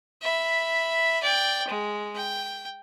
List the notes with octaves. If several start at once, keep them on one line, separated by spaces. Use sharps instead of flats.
E5 B5
D5 G5
G#3
G5